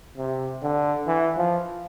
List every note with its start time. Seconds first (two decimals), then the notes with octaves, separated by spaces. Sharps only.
0.17 C3
0.63 D3
1.07 E3
1.37 F3